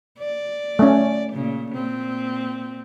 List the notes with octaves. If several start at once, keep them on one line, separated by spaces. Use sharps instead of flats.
D5
A3 C#4
A#2 C#3
A#2 C4